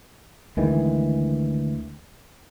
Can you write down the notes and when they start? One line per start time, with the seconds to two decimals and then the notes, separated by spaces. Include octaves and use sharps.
0.57 D2 D#3 E3 G#3